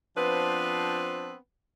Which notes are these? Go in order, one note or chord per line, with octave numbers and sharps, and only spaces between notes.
F3 B3 C4 D4 B4